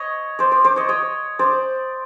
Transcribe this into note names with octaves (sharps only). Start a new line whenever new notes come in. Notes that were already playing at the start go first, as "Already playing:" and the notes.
Already playing: C#5 D#5
C5 D5
C5 D5
C5 D5
C#5 D#5
C#5 D#5
C5 D5